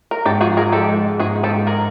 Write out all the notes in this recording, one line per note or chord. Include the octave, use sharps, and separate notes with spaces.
A#4
G#2 G4 A4
F3 F#4 G#4
F3 G#4 A#4
G#3 G4 A4
G#3
G#3
G#2 F#4 G#4
G#2
G4 A4
G#2
G#4 A#4